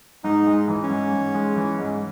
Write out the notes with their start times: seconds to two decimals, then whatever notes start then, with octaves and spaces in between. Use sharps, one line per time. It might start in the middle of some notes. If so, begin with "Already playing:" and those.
0.24 G#2 D#4
0.46 G#3
0.68 E3
0.83 C#4
0.90 G#2
1.12 G#2
1.34 G#3
1.56 E3
1.79 G#2